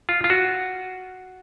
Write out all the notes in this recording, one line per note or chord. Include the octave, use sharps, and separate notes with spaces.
F4
F4
F#4